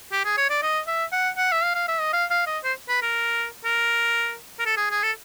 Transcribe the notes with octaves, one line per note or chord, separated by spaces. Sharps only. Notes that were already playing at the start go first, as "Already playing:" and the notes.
G4
G#4
C#5
D5
D#5
E5
F#5
F#5
E5
F5
F5
E5
D#5
F5
F5
D#5
C5
B4
A#4
A#4
A#4
A4
G#4
G#4
A4